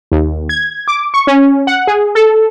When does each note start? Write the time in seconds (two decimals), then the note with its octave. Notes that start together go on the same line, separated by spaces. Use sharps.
0.12 D#2
0.49 G#6
0.88 D6
1.14 C#6
1.27 C#4
1.67 F#5
1.87 G#4
2.15 A4